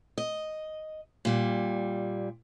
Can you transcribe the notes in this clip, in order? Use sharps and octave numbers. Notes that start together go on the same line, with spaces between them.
D#5
A#2 G3